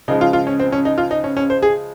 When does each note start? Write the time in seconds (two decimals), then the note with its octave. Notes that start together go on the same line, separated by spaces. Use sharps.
0.08 C#3 F3 G#3 D#4
0.21 F4
0.33 F4
0.47 C#4
0.60 C4
0.72 C#4
0.85 D#4
0.98 F4
1.11 D#4
1.24 C#4
1.37 C#4
1.50 C5
1.62 G#4